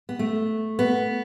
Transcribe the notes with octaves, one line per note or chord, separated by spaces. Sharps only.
B3
A3
B3